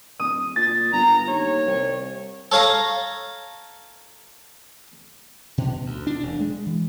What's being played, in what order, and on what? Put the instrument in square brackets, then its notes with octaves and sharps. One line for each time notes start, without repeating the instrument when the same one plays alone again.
[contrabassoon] D1 [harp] D#6
[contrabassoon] A#2 [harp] A6
[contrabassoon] G1 [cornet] A#5
[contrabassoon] D#2 [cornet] C#5
[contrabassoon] C2
[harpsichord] A4 C#5 F5 A5 A#5
[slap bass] B2
D2
D4
E1
G#3
E3